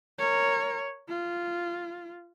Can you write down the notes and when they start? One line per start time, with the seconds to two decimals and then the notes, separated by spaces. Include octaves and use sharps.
0.18 A#4 C#5
1.09 F4